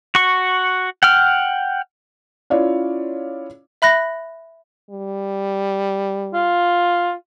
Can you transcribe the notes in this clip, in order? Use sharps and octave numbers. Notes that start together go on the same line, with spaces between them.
F#4 C#6
F#5 G5 F6
C#4 E4 F4 C#5 D5 F5
E5 B5 F#6 A#6
G3
F4